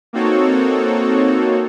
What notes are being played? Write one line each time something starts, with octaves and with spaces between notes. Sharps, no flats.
A#3 C4 D#4 F#4 A4 C#5